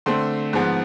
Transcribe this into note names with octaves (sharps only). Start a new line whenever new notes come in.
D3 A3 C4 C6
G#2 F3 B3